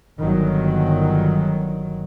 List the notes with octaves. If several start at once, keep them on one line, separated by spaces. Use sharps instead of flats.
G1 D#3 F#3